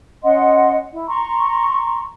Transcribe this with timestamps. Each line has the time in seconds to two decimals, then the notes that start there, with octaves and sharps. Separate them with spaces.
0.23 C#4 D#5 F#5 C6
0.93 E4
1.08 A#5 C6 C#6